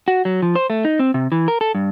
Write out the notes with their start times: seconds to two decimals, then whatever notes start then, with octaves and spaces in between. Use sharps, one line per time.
0.08 F#4
0.25 F#3
0.42 F3
0.56 C5
0.70 A3
0.85 D#4
0.99 C4
1.14 C3
1.32 E3
1.48 A#4
1.61 A4
1.75 G2